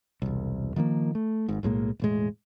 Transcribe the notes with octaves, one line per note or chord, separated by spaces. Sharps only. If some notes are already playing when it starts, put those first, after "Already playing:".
E1 C2
D#3 F3 A3 A#3
A3
G#1 G#2
B1 A2 G#3 A#3
E1 A2 G#3